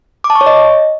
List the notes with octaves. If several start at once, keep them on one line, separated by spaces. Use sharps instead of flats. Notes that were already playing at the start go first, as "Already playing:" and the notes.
D6
A5
C#6
C#5
D#5